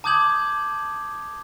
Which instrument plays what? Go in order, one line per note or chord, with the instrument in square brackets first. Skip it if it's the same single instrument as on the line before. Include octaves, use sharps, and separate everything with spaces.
[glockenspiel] A5 D6 D#6 G6 G#6 F#7